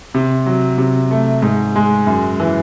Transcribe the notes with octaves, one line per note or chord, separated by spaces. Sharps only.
C3
F#3
C3
A3
G#2
G#3
F#2
E3